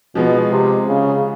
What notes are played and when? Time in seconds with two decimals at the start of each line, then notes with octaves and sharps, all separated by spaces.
0.15 B2 F3 G#3 B3
0.51 C3
0.88 C#3